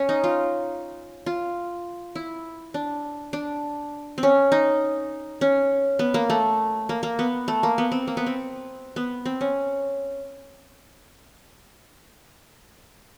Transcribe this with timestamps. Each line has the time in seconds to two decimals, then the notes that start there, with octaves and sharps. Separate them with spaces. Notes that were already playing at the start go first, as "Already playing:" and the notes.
Already playing: C#4
0.09 D#4
0.24 F4
1.26 F4
2.15 E4
2.74 D4
3.33 D4
4.18 C4
4.23 C#4
4.52 D#4
5.41 C#4
5.99 B3
6.14 A#3
6.30 A3
6.89 A#3
7.03 A#3
7.19 B3
7.48 A3
7.63 A#3
7.78 B3
7.92 C4
8.07 A#3
8.17 B3
8.26 C4
8.96 B3
9.25 C4
9.41 C#4